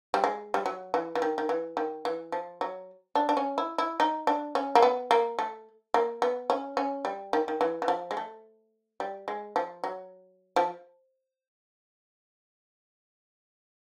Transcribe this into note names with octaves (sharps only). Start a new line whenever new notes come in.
G3
G#3
G3
F#3
E3
E3
D#3
D#3
E3
D#3
E3
F3
F#3
D4
D4
C#4
E4
E4
D#4
D4
C#4
A#3
B3
A#3
A3
A#3
B3
C#4
C#4
G3
D#3
D#3
E3
E3
F3
G#3
A3
G3
G#3
F3
F#3
F3